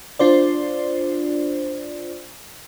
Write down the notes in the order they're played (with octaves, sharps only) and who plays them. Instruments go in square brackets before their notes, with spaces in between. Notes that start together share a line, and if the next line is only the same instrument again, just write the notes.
[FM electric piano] D4 F4 C5 D5